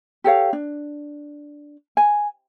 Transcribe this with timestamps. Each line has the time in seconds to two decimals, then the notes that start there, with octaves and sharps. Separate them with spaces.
0.24 G4 A4 C#5 F5
0.53 D4
1.97 G#5